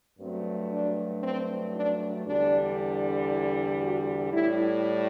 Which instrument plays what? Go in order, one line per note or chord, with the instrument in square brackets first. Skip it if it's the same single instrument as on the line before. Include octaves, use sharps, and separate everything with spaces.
[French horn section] G2 F#3 A3 C4
D4
C4
D4
E2 D3 G3 D4
E4
F#4
A2 G3 E4